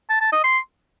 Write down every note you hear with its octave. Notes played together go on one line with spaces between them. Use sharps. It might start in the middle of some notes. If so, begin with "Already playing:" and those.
A5
A5
D#5
C6